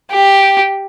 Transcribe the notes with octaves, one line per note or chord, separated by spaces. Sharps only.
G4